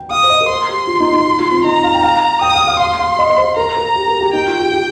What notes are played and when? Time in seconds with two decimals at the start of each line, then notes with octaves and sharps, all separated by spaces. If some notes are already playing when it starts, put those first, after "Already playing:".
Already playing: G5
0.10 F5 D#6
0.23 C5
0.30 D#5
0.41 A#4
0.49 C5 C6
0.69 G4
0.87 F4
1.00 D#4
1.13 D#4
1.26 F4
1.39 F4
1.52 C4
1.64 D#4 A#5
1.84 F5
1.94 G5
2.03 F5
2.41 G5 D#6
2.54 F5
2.67 F5
2.79 F5 C6
2.99 F5
3.19 D#5
3.30 D#5
3.38 C5
3.57 A#4 A#5
3.77 A#4
3.95 G4
4.08 A#4
4.21 G4
4.33 D#4 G5
4.47 F4
4.60 G4
4.72 G4